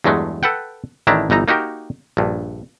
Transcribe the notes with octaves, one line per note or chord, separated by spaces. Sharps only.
E2 G2 F#3 G#3 A3
A4 B4 F#5 G5
A1 D#3 D4 E4 A5 A#5
G1 E3 D#4 A#5
A#3 D#4 F#4 G4 A#4
A#1 G2